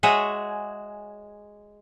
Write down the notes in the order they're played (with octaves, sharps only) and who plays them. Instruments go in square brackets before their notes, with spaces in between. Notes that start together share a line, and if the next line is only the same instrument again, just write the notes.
[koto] G#3 F#4 G#4 C#5 E5 G#5